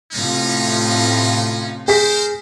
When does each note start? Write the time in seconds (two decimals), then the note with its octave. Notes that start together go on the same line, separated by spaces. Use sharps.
0.13 A2 C3 C#4 D#4 F4
1.88 G#4 A#4 C5 B6